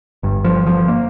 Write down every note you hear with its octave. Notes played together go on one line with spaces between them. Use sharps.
G1 G2
F3
F3
A#3